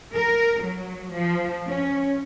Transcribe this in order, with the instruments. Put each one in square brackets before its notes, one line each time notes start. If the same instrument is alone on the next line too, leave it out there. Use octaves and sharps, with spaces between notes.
[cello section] A#4
F#3
F3
C#4